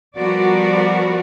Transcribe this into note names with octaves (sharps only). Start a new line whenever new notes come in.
F3 G3 B3 F#4 A#4 D5